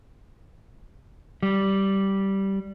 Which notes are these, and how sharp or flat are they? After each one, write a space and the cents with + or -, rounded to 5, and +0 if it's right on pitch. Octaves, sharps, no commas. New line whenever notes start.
G3 -10